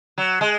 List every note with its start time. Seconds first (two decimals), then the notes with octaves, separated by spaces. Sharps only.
0.18 F#3
0.41 G#3